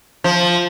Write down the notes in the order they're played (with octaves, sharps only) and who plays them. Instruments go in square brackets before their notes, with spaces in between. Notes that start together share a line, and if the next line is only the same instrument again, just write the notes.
[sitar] F3